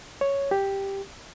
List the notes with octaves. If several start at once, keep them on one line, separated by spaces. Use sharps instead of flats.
C#5
G4